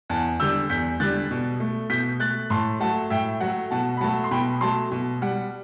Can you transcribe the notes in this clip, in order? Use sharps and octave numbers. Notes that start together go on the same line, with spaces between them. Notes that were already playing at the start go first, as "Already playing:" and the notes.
E2 F#5 A5
D3 G3 E6 G6
E2 G6 B6
D3 G3 F#6 A6
B2
A3
B2 G6 B6
A3 F#6 A6
A2 A5 C6
F#3 A3 F#5 A5
A2 E5 G5
F#3 A3 F#5
B2 F#5 A5
B5
F#3 A3 F#5 A5
C6
B2 G5 B5
F#3 A3 A5 C6
B2
G3 F#5